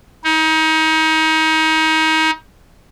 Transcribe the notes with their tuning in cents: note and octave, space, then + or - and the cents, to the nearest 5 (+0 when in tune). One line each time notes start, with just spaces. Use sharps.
D#4 +30